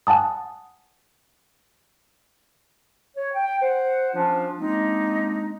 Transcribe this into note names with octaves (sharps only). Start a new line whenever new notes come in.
F#5 G#5 A5 D#6
C#5
G5
C5 F#5
F3 C#4 D4 F4
G#3 A#3 C4 D4 D#4